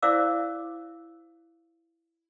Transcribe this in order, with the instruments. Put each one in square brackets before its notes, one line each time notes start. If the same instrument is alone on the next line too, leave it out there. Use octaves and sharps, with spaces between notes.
[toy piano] E4 C5 D5 F5 D6 E6